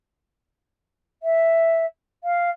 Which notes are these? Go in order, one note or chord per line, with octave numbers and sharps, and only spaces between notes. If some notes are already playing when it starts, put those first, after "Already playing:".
E5
F5